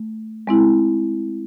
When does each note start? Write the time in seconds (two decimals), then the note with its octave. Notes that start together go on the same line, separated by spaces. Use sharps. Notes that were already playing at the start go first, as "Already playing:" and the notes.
Already playing: A3
0.47 G#3 C4 E4